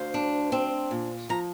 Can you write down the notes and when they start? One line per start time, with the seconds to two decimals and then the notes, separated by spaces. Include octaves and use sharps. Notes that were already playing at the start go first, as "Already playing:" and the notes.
Already playing: D2 C5 F5
0.14 D4
0.52 C4
0.91 A#2
1.29 F3 A#5